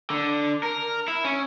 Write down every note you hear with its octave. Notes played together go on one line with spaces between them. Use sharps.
D3
A#4
E4
C#4